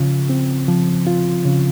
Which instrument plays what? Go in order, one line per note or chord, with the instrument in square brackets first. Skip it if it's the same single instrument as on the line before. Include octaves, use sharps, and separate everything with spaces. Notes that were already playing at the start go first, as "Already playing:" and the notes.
Already playing: [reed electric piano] C#3 F3 F4
C4
F3
F4
C#3